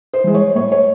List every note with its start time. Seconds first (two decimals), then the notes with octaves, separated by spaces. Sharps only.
0.13 C5
0.24 E3 G#3
0.34 C#5
0.55 A2 C#5
0.72 C#5